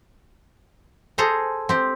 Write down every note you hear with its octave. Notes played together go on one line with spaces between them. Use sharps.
G#4 A4 C5 A#5
C4 G4